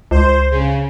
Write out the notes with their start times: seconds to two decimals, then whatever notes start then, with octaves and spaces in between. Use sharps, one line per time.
0.11 C#2 C5
0.51 C#3